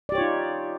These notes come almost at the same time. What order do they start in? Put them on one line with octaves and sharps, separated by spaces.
D5 G4 C#5 F4 D#4